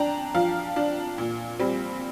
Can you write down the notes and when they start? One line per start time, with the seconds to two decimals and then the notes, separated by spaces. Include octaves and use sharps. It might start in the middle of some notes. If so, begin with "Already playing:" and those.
Already playing: D4 G5 A#5
0.35 F3 F5
0.76 D4
1.18 A#2
1.60 G3 C4